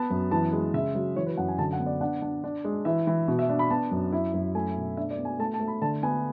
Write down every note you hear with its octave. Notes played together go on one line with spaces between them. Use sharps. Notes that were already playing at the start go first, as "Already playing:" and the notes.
Already playing: B3 A5
F#2
E3 A5
G#3
C#3 E5
F#3
E3 C#5
B4
F#2 F#5
G#5
D3 A5
F#5
B3
D5
D4 F#5
D4
D4
G#3
E3 E5
E3
B2
E5
D4
B5
B3 A5
F#2
E4
F#2
A3 G#5
B2
D4 E5
D5
B3
G#5
A3 A5
A5
A3
B5
D3 A5
B3 G#5